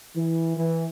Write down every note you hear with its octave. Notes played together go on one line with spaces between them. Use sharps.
E3
E3